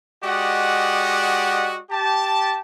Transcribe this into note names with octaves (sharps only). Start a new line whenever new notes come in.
G#3 F#4 G4 D5 D#5 F#5
G4 A5